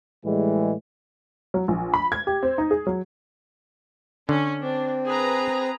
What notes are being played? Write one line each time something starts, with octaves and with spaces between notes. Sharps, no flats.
A2 E3 G3 G#3
F#3
A#1
B5
G#6
G4
C4
D#4
G#4
F#3
D3 C#4
C4 D4
G#4 B4 A#5